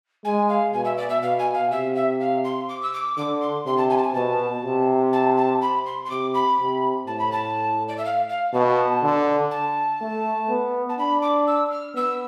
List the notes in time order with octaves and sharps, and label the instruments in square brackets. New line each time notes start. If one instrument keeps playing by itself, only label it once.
[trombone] G#3 [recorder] G#5
[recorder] F5
[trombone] B2 [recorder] G#5
[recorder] E5
D5
E5
[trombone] B2 [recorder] F5
[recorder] G#5
F5
[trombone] C3 [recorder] E5
[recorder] E5
F5
C6
D6
E6
D6
[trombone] D3 [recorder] D6
[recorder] C6
[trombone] C3 [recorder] C6
[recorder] A5
G#5
A5
G#5
[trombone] B2 [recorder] A5
[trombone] C3
[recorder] A5
A5
B5
C6
C6
[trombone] C3 [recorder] D6
[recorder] B5
[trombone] C3
[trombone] A2 [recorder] A5
[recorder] B5
A5
D5
E5
F5
F5
[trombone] B2 [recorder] A5
[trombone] D3
[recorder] A5
[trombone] A3
B3
[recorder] A5
[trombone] D4 [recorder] B5
[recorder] D6
E6
F6
[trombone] B3 [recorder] E6